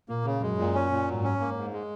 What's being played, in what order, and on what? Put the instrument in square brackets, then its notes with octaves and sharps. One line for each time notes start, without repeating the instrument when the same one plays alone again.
[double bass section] A#2 [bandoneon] A#3
[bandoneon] C#3
[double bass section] F#2 [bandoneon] G#3
[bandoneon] A#2
C#4
A#2
[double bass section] G#2 [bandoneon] F#3
[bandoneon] C#4
A#3
G#2
G#3